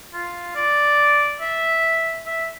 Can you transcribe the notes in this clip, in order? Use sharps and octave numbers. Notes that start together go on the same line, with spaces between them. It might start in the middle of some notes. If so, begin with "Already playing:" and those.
F4
D5
E5
E5